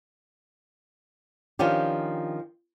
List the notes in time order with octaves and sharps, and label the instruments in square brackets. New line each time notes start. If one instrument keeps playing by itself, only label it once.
[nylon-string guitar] D#3 F3 C#4 D4 F4 G4